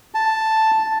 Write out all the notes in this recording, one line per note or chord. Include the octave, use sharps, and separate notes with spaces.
A5